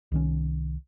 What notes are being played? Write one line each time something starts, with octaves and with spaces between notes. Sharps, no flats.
C2 D#3 C#4